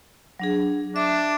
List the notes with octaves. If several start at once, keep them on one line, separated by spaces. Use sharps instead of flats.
F#3 D4 G#4
D4 E5